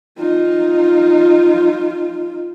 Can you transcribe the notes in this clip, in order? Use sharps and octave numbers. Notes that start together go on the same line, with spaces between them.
D#4 F4